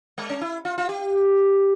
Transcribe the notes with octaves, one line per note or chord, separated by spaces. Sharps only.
G#3
C#4
E4
F4
F4
G4